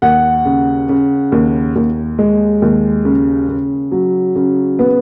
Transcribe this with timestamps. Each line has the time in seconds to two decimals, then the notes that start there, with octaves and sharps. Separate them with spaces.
0.02 D#2 F#5
0.45 C#3
0.89 C#3
1.32 D#2
1.76 D#2
2.19 G#3
2.62 D#2
3.05 C#3
3.49 C#3
3.92 F#3
4.36 C#3
4.79 B3